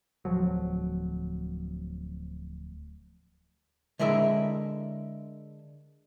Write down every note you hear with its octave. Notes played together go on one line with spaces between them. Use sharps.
D1 F3 F#3
D3 G#3 E4 A#4 E5